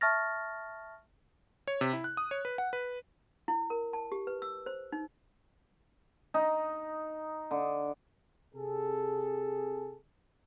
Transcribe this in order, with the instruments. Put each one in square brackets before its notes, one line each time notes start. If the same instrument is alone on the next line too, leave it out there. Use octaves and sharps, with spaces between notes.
[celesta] E5 A5 C#6 F6 A6 A#6
[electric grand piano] C#5
C3
E4
F#6
D#6
C#5
B4
F#5
B4
[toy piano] E4
A#4
A5
G4
B4
E6
C5
D#4
[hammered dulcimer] D#4
D3
[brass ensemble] C3 G#4 A4